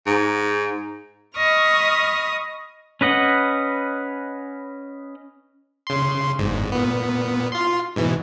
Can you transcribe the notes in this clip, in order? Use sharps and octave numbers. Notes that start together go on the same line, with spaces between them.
G#2
D#5 B5 C#6 D#6 F6
C#4 B4 D#5 F#5
C#3 C6
G1 G#2
A#2 B3
F4 C6
G#2 B2 E3